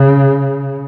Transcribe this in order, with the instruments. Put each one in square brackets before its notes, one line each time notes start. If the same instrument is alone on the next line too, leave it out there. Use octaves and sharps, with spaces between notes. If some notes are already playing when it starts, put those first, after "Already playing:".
Already playing: [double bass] C#3